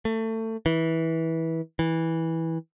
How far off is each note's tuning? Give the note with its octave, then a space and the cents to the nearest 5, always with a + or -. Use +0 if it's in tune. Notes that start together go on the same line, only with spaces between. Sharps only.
A3 +25
E3 -20
E3 -15